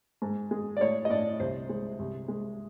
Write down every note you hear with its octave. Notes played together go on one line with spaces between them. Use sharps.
G#2
G#3
D5
A2 C#5
D#5
A2 D5
C2 C5
G#3
C2
G#3